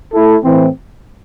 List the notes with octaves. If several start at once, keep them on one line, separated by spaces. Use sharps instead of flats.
A3 E4 A4
A2 E3 C4